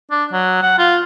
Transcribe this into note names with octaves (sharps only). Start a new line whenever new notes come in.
D4
F#3
F#5
F4